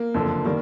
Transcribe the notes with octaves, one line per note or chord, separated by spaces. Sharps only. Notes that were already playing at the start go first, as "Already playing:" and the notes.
Already playing: A#3
F#1 F2 D3
D#3 G3 A#3